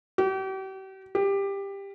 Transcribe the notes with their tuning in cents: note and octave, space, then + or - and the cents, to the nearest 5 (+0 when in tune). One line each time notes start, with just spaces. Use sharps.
G4 -40
G4 +15